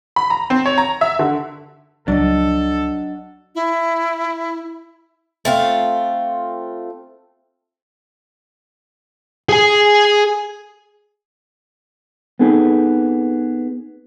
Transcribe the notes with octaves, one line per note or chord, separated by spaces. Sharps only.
B5
A#5
C4
C#5
A#5
E5
D3
C#2 F3 F#3 D4 A4 D#5
E4
A3 C4 F4
G#4 G#5
B3 C4 D#4 G#4 A4 B4